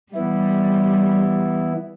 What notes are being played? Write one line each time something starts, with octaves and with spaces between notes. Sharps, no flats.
E3 G3 B3 E4